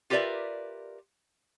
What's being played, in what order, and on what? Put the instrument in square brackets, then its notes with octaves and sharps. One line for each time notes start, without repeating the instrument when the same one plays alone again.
[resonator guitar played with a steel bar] F4 G4 A#4 B4 D5 E5